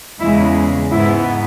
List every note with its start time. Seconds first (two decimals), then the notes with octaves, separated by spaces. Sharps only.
0.20 E2 C#3 G#3 E4
0.92 G#2 G#3 B3 E4